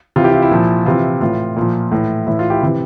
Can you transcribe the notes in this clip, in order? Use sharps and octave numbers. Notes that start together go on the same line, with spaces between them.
C3 E3 F4
E4 G4
F4
E4
A#2 F3
C3 E3 F4
A2 E3 F4
A#2 F3
A2 E3
A2 E3 E4
F4
E4 G4
C3 E3